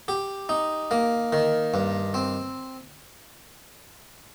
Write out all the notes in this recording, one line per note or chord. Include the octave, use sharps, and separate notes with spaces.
G4
D#4
A#3
D#3
G2
C4